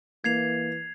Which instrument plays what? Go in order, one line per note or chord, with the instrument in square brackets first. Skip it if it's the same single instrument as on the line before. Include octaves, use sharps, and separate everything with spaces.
[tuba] E3 [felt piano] A#3 [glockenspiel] G#6 C7 F7